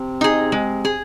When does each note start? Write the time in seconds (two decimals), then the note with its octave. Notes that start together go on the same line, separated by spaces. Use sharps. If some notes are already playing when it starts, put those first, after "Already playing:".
Already playing: C3
0.21 D#4 G#4
0.52 G#3
0.85 G#4